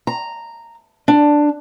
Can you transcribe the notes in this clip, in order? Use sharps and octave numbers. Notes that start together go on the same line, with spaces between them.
A#5
D4